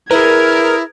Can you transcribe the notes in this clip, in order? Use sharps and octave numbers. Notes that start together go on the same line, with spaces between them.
E4 G#4 A#4 B4 G#6